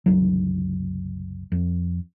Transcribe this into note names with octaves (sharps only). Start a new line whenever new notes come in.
F#1 C2 F#3
F2